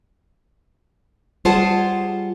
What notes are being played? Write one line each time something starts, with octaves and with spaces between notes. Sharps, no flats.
G3 F4 G#4 C5 F#5 A5